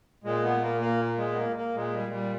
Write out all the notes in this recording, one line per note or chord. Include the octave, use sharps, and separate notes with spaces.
A#2 G#3
B3
A#3
A#3
G#3
B3
A#3
A#3
A#2 G#3
G3
G3